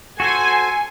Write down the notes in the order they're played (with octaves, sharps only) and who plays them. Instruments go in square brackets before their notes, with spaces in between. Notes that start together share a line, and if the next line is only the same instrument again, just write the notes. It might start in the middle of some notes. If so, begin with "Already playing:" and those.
[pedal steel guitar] F#4 A4 C5 [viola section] G#5